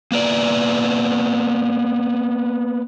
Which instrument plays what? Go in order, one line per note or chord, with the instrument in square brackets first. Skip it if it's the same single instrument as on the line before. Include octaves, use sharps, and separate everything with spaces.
[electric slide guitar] A#3 B3 D5